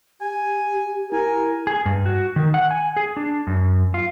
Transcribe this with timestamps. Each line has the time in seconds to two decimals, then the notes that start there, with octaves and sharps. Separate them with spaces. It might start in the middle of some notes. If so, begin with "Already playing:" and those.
0.21 G4 G#5
1.12 E4 A#4 G#5
1.67 G#4
1.86 G2
2.06 F#4
2.36 D#3
2.54 F#5
2.71 G#5
2.97 G#4
3.17 D4
3.47 F#2
3.94 F4